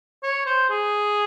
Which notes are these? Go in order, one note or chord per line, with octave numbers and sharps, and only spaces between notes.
C#5
C5
G#4